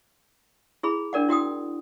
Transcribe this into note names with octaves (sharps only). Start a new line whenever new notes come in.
E4 G#4 B5
D4 A#4 D5 F#5
E4 F#4 G5 D#6